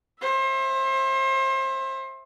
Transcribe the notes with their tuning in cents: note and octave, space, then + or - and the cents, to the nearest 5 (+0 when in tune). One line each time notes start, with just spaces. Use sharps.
C5 +30 E5 +0